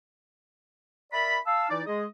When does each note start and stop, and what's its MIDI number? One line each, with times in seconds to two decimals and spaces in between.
1.13 1.37 70
1.13 1.37 74
1.13 1.37 76
1.13 1.37 83
1.46 1.67 77
1.46 1.67 81
1.46 1.67 88
1.70 1.81 52
1.70 1.81 63
1.70 1.81 64
1.70 1.81 74
1.87 2.05 56
1.87 2.05 68
1.87 2.05 75